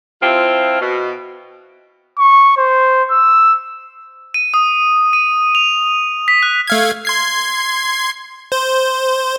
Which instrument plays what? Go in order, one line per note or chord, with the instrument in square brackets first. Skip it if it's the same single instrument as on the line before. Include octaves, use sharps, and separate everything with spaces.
[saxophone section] F3 C4 E4 F4
B2
[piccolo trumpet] C#6
C5
E6
[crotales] D#7
D#6
D#7
F7
B6
F#6
[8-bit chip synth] A3 F5 G#6
C6 G#6 C7
C5